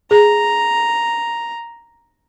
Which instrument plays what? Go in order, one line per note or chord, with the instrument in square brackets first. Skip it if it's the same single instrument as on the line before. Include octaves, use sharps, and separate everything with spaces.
[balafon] G#4 [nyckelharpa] A#5